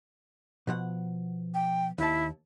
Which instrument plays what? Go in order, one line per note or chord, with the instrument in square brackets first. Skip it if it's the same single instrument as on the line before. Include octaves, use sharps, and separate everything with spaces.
[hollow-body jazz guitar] B2 F3 F#5
[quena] G5
[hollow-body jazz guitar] D#2 A5 [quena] E4